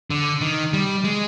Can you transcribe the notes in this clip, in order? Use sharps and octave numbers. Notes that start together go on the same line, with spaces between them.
D3
D#3
G3
G#3